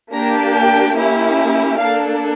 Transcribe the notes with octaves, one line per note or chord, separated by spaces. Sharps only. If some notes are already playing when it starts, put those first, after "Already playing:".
A#3 D4 G4 A#5
G5
A#3 C#4 E4 G4
A#3 D4 A4 F5